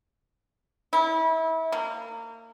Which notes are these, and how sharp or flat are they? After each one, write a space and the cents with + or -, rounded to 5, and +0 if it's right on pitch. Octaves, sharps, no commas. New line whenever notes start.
E4 -30
A#3 -30